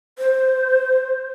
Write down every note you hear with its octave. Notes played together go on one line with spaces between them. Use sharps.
C5